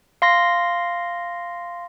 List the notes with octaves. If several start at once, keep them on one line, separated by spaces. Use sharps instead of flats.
F5 C6 A#6